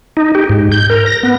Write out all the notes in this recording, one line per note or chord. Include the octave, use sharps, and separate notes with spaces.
D#4
G4
G#2
G6
A#4
A#6
B3